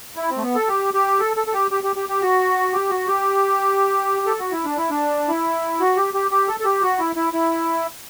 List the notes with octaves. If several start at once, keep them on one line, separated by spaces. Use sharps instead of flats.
E4
C4
A3
B3
A4
G4
G4
A4
A4
A4
G4
G4
G4
G4
G4
F#4
G4
F#4
G4
A4
F#4
E4
D4
E4
D4
E4
F#4
G4
G4
G4
A4
A4
G4
F#4
E4
E4
E4